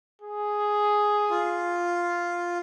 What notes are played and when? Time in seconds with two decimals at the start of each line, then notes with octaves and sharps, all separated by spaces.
0.22 G#4
1.30 F4